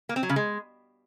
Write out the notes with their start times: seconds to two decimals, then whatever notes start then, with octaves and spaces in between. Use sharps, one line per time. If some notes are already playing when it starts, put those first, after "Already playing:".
0.09 A#3
0.16 C4
0.23 F#3
0.29 C#3
0.36 G#3